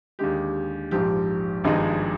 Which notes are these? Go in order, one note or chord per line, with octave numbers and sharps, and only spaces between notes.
D#2 D3 G#3 G4
A#1 G#2 F3 G4
G#1 G2 F3 G#3 D#4